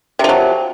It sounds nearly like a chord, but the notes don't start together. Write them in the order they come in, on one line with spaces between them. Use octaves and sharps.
C3 F3 F#3